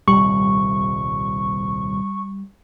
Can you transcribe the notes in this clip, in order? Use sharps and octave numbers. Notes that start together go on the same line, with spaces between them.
D#1 C2 G3 C#6